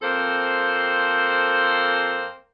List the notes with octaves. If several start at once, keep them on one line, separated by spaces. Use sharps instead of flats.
F2 A#3 C4 A4 C5